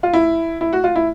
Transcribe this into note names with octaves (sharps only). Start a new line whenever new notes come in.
F4
E4
E4
F#4
F4
E4